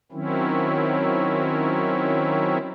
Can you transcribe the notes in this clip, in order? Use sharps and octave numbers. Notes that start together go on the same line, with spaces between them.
D#3 F#3 C4 C#4 E4